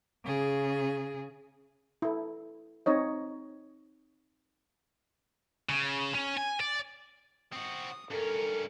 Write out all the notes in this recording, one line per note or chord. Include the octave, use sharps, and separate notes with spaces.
C#3 G#4
E4 A4
C4 D#4 C#5 D#5
C#3
C#4
G#5
D5
C4 F#4 D#6
G2 C#4 A4 A#4